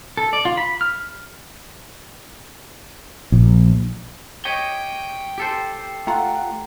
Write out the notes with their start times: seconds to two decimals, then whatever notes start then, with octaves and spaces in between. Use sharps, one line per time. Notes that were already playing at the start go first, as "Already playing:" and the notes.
0.17 A4
0.33 D5
0.45 F4
0.57 B5
0.81 F6
3.32 A#1
4.45 G4 C#5 D#5 G5
5.38 G4 A4 C5
6.07 A3 F4 F#5 G5 A#5